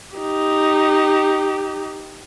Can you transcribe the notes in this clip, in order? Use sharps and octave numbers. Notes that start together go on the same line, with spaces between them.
D#4 G4